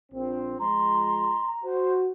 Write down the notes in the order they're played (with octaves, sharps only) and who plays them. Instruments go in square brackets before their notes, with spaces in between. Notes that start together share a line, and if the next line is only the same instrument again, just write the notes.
[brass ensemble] A#1 C4
[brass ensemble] F3 G#3 [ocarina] A#5 [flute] C6
[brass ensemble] F#4 [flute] C5